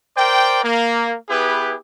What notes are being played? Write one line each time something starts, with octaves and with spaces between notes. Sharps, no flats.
A#4 C5 D5 G5
A#3
B3 E4 G4 G#4 B4